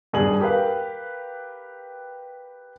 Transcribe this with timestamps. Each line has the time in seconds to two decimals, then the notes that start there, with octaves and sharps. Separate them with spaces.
0.13 D#1 G2 G#4 D#6 F#7
0.41 G4 A#4 B4 F5